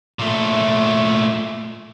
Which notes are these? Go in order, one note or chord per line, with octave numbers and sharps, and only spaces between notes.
A#2 A3